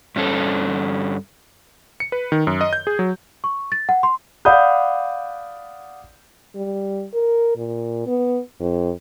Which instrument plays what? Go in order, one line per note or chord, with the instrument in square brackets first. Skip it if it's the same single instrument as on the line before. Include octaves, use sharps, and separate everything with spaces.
[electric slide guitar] G2 C#4 A4
[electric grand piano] C#7
B4
D#3
F#2
D#5
G6
G#4
F#3
[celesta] C#6
A6
F#5
C6
[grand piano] D5 F5 F#5 B5 D#6 G6
[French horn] G3
A#4
A#2
B3
F2